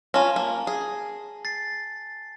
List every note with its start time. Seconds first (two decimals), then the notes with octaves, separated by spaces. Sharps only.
0.14 C#4 F4 G#5 A5 A#6
0.36 A#3
0.67 G#4
1.45 A6 C7